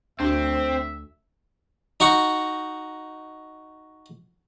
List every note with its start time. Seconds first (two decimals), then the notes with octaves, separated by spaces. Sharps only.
0.20 D2 C4 D4 F#4 E5
2.00 D#4 F#4 C#6